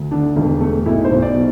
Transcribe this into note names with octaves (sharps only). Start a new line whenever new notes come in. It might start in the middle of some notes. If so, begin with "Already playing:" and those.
Already playing: D2
D3 D4
E1
A3
B1 E4
C5
B1
D5
B2